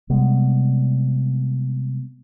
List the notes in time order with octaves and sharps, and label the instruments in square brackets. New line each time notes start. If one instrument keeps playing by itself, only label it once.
[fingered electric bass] C3 G3 G#3 B3